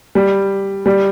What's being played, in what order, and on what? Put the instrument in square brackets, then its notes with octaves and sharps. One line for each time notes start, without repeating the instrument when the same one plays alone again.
[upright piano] G3
G3